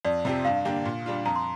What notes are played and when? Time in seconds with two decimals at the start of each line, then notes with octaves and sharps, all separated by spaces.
0.05 F2 D5
0.25 C3 F3 C4 G4
0.45 G2 F5
0.65 D3 A#3 D4 G4
0.85 A#2
1.06 G3 D4 F4
1.26 F2 A#5
1.36 C6